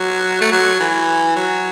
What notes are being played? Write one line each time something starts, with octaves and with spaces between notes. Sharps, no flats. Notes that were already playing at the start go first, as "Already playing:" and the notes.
Already playing: F#3
A3
F#3
E3
F#3